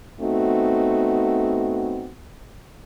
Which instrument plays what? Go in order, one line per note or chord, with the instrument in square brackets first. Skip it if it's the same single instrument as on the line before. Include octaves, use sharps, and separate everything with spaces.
[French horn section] A3 B3 C4 D#4 F#4